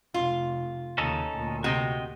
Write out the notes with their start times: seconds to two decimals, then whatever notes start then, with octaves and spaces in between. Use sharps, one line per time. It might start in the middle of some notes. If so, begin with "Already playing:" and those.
0.14 F1 F4
0.98 D#2 C#3 C#4 D#4 A4
1.31 D2 A#2
1.64 C3 F#4 D#5 G5